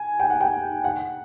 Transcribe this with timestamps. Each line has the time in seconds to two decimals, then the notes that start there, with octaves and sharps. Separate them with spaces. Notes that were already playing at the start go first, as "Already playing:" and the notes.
Already playing: G#5
0.20 G5
0.30 F#5
0.41 G5
0.84 F#5